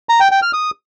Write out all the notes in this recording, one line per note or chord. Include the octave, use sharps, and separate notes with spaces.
A#5
G5
G5
F6
D#6